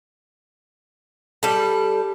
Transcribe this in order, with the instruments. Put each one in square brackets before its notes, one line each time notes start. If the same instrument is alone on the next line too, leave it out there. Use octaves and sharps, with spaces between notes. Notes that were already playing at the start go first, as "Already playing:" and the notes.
[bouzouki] G3 A4